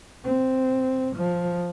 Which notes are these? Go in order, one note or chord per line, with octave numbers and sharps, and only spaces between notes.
C4
F3